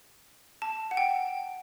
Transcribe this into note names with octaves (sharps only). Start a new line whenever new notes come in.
A5
F#5
G5